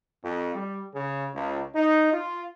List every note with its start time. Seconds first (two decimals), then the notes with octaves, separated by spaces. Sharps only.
0.23 F2
0.55 G3
0.94 C#3
1.33 C#2
1.74 D#4
2.11 F4